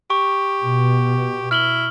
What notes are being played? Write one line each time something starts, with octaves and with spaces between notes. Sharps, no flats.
G4 C#6
B2
E4 F6 F#7 G7